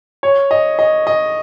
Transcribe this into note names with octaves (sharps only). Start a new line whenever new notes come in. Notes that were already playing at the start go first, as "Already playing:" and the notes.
C#5
D#5
D#5
D#5